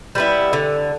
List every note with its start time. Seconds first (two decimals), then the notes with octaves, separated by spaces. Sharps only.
0.15 G3 B3 E4
0.53 D3